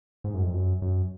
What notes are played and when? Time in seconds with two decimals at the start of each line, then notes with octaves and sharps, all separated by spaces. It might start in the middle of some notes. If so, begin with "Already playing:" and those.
0.24 G#2
0.34 F#2
0.43 F2
0.54 F#2
0.82 F#2